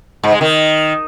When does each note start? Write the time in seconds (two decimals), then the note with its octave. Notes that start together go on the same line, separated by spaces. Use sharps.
0.23 G#2
0.32 G#3
0.41 D#3